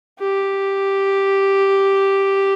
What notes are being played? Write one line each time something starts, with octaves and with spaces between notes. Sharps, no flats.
G4